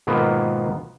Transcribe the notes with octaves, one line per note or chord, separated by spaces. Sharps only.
G#2 B2 D#3 A#3 B3 F4